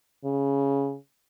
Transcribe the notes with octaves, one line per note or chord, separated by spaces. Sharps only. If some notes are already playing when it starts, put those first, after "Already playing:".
C#3